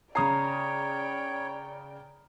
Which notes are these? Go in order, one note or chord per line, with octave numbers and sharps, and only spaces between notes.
C#3 C#5 D5 G5 A#5 D#6 C7